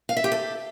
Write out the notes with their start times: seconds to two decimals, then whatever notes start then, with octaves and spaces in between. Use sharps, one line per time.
0.09 F5
0.17 E5
0.24 G4
0.32 A4